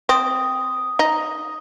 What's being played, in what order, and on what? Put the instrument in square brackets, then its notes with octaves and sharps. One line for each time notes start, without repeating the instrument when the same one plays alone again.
[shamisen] C4 [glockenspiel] D#6
[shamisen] D#4